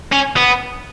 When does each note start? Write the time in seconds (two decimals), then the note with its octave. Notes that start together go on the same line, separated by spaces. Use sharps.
0.13 C#4
0.37 B3